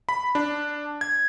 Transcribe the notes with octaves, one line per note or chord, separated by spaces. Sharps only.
B5
D4
G#6